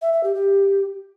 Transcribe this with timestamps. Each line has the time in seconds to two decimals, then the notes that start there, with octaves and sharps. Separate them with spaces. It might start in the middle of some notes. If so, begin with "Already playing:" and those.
0.02 E5
0.13 E5
0.24 G4
0.34 G4